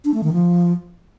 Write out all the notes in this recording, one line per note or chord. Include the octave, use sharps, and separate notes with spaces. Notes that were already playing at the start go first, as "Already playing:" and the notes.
D4
A3
D#3
F3